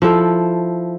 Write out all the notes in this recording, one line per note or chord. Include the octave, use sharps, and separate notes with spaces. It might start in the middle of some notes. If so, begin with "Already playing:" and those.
F3 E4 A4